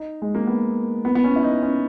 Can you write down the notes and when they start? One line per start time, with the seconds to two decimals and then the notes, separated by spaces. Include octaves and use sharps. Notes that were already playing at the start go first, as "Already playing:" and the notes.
Already playing: D#4
0.22 G#3
0.35 A#3
0.47 B3
1.05 B3
1.15 B3
1.24 C#4
1.36 E4
1.43 D#4
1.63 C#4